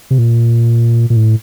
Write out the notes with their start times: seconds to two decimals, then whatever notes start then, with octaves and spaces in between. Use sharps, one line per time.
0.11 C3
0.18 A#2
1.10 A#2
1.16 A2